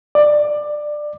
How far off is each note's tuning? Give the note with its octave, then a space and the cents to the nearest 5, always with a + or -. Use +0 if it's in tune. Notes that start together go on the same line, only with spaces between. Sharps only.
D5 +15